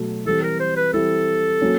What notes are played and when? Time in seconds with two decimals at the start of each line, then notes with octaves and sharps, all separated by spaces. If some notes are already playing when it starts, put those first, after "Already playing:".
Already playing: B2 F#3 A3
0.25 E3 G3 C4 E4 G4 A4
0.43 A#4
0.59 C5
0.77 B4
0.93 E3 G3 C4 E4 G4 A4
1.61 F#3 A#3 C#4